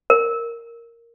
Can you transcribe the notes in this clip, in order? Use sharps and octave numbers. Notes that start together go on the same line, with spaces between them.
A#4